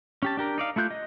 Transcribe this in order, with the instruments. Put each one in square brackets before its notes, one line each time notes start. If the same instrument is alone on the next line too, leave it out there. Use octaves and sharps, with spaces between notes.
[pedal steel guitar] C#4 G4 A5
D4 G4 A#4
D#4 D5 F5
A3 E4 F4 F#6 G6
D#5